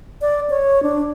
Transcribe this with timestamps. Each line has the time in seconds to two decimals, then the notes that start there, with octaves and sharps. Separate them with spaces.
0.21 D5
0.50 C#5
0.83 D4